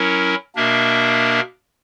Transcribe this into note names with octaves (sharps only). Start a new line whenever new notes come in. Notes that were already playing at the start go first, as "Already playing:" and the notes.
Already playing: F#3 C#4 E4 A#4
B2 A#3 D4 A#4 E5